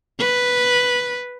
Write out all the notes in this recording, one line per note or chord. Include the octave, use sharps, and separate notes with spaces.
B4